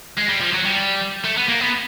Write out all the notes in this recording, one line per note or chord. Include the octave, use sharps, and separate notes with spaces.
G#3
G3
F3
F#3
G3
A3
B3
A#3
B3